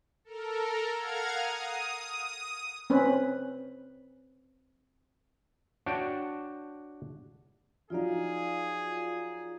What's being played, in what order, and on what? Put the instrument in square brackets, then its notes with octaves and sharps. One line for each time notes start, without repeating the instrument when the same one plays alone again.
[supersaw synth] A4 A#4
F5 F#5 A#5 F6 G#6
D#6
[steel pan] C4 C#4 B4
[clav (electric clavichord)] D4 F#4 C#5 G5 A5
[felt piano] F3 F#3 D#4 [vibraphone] F4 D5 F5 [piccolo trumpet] G#4